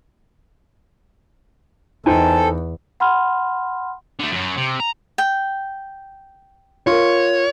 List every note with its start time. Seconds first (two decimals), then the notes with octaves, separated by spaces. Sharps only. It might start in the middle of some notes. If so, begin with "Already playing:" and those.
2.06 E2 D#4 A4 C5 G5 G#5
3.00 F#5 B5 C6 F6
4.20 D3 A3
4.32 F#2 F#3
4.57 C3
4.80 A#5
5.18 G5
6.87 F4 A#4 C#5